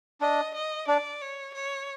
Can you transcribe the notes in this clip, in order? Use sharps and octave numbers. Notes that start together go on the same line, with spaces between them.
D4 D#5
D#5
D4 D5
C#5
C#5